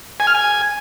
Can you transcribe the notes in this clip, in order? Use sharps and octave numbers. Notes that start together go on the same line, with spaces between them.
G#5
F6
G#5